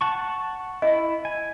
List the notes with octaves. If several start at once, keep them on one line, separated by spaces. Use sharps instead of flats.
F#5 A5 C#6
E4 D#5
G#5